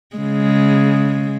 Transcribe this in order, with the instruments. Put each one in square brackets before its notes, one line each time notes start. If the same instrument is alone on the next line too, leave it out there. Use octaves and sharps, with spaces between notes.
[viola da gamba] C#3 G#3